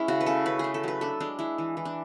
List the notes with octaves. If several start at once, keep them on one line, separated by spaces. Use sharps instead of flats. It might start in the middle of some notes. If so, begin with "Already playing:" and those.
Already playing: G#3 C#4 E4
C#3 F#4
B4
C#3 A4
C#4 B4
A3 G#4
A4
F#3 B4
D4 A4
G#3 D4
G#3 E4
E3
E3
D4